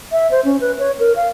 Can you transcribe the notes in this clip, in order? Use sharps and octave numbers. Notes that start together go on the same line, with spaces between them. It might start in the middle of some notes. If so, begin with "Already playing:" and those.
E5
C5
C#4
B4
C#5
A#4
F5